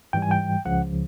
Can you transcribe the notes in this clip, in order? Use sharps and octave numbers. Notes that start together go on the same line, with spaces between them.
G#2 E3 G3 G5
G#5
G5
C#2 C#3 F3 F#5